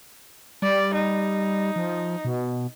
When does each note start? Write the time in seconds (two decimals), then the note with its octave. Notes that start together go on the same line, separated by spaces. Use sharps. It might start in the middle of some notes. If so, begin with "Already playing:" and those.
0.62 G3 D5
0.94 D#4
1.76 F3
2.25 B2